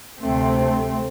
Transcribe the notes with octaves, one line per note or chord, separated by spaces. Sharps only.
D2 C3 A3 C4